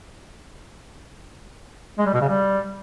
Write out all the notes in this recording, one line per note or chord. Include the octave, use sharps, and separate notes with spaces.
G#3
G3
B2
C#3
G3